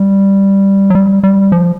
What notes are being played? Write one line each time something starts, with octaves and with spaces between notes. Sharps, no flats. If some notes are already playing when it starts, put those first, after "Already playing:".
Already playing: G3
F#3
G3
G3
F3